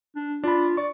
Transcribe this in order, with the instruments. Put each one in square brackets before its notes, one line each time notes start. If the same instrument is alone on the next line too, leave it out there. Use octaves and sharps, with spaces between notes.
[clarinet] D4
[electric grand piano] D4 B5 [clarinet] F4
[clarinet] D5 [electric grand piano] C#6